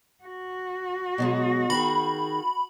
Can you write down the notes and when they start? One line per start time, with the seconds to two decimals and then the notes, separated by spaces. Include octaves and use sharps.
0.24 F#4
1.18 B2 F#3 G#3
1.70 D#3 G#4 B5